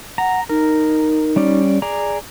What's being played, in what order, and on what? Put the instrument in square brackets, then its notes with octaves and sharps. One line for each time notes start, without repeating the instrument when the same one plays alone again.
[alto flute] F#5 [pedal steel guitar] A#5
[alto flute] D#4 [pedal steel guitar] A#4
[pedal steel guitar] G3 C#4 D5
G#4 D5 A#5